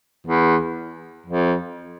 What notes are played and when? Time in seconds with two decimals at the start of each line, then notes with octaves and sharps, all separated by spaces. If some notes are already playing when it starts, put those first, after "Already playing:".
0.27 E2
1.26 F2